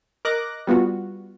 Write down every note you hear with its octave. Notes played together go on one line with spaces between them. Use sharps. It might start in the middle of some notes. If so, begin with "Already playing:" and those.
A#4 D#5 D6 F#6 A#6
G3 B3 F4 F#4